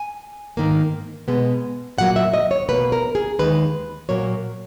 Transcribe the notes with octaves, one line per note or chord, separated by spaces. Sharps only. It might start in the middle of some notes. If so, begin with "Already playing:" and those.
Already playing: G#5
G#2 D#3 A#3
B2 G#3 B3
A#2 F#3 A#3 F#5
E5
D#5
C#5
B2 A#3 B4
A#4
G#4
D#2 D#3 G#3 B4
A#2 F#3 A#3 C#5